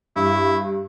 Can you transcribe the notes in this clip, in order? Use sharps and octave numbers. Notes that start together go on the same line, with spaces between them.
G2 E4